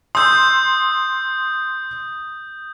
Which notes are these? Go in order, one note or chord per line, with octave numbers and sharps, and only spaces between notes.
C6 D#6 E6 G6